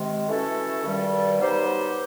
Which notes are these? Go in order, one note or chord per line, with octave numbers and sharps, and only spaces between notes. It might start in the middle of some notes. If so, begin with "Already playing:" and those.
Already playing: C3 D#3 G#3
E3 A3 C#4 F#4 A4
G2 D#3 G3
F#3 B3 D#4 G4 C5